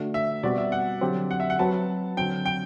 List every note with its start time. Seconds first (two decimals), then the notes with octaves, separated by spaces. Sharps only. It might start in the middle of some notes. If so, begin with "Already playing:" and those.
Already playing: D3 A3 D4 F#4
0.14 E5
0.43 B2 G3 C4 F#4 D5
0.58 E5
0.72 F#5
1.01 D3 F#3 C4 G4
1.31 F#5
1.40 E5
1.50 F#5
1.59 F#3 C4 F#4 B4 A5
2.17 D3 F#3 C4 G5
2.46 G5